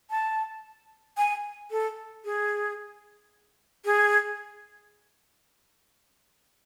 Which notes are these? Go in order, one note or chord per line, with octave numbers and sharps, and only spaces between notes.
A5
G#5
A4
G#4
G#4